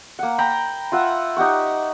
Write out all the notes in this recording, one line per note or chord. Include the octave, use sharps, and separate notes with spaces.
A#3 F#5
G5 A#5 B5
F4 E5 F#5
D#4 G4 F#5 C#6